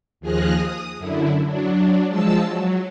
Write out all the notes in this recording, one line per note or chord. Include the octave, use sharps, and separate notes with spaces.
D#2 F3 G#4 F6 F#6 A#6
D#6
F#2 D3 E4
F#3 D4
F3 G#3 A5 E6
F#3